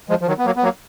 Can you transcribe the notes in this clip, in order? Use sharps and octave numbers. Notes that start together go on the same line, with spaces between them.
F3 G#3
F3
D#3 F#3
B3
F#3 A#3
B3
F#3 A#3